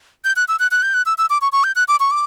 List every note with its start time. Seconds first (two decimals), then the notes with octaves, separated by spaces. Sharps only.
0.25 G6
0.36 F#6
0.48 E6
0.60 F#6
0.71 F#6
0.83 G6
0.94 F#6
1.06 E6
1.18 E6
1.30 D6
1.41 C#6
1.53 C#6
1.64 G6
1.76 F#6
1.88 D6
2.00 C#6
2.11 D6